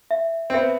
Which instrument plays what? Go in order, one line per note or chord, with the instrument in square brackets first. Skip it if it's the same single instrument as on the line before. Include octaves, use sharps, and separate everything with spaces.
[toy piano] E5
[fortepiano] C4
[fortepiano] B3 [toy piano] E5